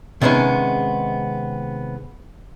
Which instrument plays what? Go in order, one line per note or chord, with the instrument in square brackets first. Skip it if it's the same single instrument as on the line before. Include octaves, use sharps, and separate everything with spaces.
[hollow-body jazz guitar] C3 D#3 G#3 B3 C#4